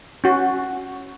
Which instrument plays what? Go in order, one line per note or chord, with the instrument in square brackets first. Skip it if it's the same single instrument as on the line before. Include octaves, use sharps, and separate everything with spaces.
[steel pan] C#4 F#4